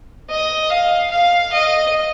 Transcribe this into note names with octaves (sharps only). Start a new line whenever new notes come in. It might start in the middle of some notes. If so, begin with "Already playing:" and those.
D#5
F5
F5
D#5